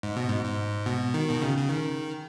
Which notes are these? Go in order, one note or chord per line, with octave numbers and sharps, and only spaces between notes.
G#2
B2
G#2
G#2
B2
D#3
B2
C#3
C#3
D#3